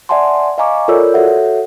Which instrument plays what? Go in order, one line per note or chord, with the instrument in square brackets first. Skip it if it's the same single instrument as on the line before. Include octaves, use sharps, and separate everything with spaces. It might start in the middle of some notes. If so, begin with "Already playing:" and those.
[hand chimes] D5 E5 F#5 G#5 A5 C6
D#5 F5 G#5 A#5 C#6 D6
F4 A4 A#4 C#5 D5 E6
F#4 A4 C#5 E5 F#5